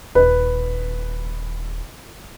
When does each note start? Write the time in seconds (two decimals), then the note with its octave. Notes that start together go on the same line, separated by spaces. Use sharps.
0.15 D#1 B4